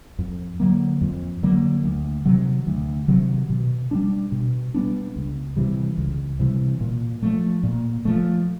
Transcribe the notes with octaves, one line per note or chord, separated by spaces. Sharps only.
F2
D3 F#3 A#3
F2
D3 F#3 A#3
D2
C3 D#3 F#3
D2
C3 D#3 F#3
B2
G3 B3 D4
B2
G3 B3 D4
C#2
C3 E3 G3
C#2
C3 E3 G3
A#2
F3 A3
A#2
F3 A3